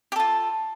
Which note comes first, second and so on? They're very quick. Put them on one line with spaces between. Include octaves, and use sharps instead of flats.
G4 A4 F4